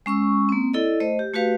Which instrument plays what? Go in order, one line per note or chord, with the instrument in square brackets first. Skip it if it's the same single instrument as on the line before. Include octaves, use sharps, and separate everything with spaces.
[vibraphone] G#3 C#4 C#6 E6
A#3 C4
E4 A4 D5 D#5
A3 C5 D#5
G4
A3 F#4 G4 B4 F5